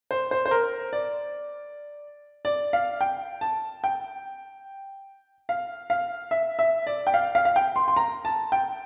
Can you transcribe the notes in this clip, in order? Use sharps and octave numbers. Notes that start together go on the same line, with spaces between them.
C5
C5
C5
A#4
D5
D5
F5
G5
A5
G5
F5
F5
E5
E5
D5
G5
F5
F5
F5
G5
C6
C6
A#5
A5
G5